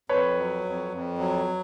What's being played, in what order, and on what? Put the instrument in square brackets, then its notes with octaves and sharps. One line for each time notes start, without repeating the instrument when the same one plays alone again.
[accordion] F2 [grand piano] B4 C#5
[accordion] F#3
F2
F2
F#3